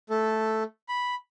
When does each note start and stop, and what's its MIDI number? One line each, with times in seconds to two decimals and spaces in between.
0.10 0.63 57
0.10 0.63 69
0.89 1.15 83